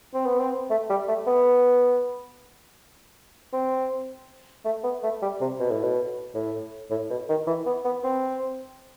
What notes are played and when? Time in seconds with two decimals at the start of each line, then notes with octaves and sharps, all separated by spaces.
0.14 C4
0.26 B3
0.40 C4
0.70 A3
0.89 G3
1.08 A3
1.27 B3
3.53 C4
4.65 A3
4.84 B3
5.03 A3
5.22 G3
5.41 C3
5.60 B2
5.71 A2
5.84 B2
6.34 A2
6.90 A2
7.10 B2
7.29 D#3
7.47 E3
7.66 B3
7.85 B3
8.04 C4